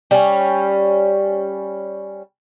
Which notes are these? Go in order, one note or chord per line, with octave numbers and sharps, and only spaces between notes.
G3 C#4